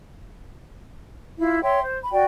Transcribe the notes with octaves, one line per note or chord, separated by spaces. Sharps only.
E4 F4 F5
C#5 E5 G5 C6
C5
B5
F#4 D5 G5